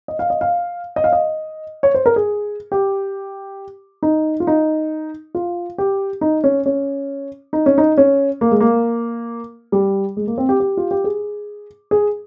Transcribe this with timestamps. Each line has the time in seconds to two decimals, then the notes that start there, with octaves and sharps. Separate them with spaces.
0.08 D#5
0.19 F5
0.30 D#5
0.41 F5
0.96 D#5
1.04 F5
1.13 D#5
1.83 C#5
1.94 C5
2.06 A#4
2.16 G#4
2.72 G4
4.03 D#4
4.40 F4
4.47 D#4
5.35 F4
5.78 G4
6.21 D#4
6.44 C#4
6.66 C#4
7.53 D#4
7.66 C#4
7.78 D#4
7.98 C#4
8.41 A#3
8.51 G#3
8.61 A#3
9.72 G3
10.17 G#3
10.27 A#3
10.38 C4
10.49 G4
10.60 G4
10.77 F4
10.91 G4
11.04 G#4
11.91 G#4